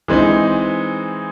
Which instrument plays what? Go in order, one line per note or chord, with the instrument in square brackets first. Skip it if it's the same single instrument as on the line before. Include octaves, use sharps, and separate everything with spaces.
[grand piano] E3 G#3 C4 D#4